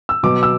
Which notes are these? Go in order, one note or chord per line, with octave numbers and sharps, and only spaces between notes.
E6
B2 F#3 B3 D6
E6